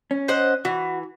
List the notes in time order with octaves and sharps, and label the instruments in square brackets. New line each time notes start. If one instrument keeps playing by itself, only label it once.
[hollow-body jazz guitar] C#4
[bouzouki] C5 D#5 F#5
[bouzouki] E3 [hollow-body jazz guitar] F#4